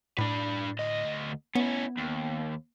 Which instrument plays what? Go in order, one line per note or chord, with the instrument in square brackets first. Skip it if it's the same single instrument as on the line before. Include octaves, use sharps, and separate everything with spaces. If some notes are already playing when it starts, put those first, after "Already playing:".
[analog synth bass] A2 [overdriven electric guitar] D4 B4
[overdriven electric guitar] D2 D#5
[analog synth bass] B3 [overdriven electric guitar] C#4 E4
[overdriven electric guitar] D#2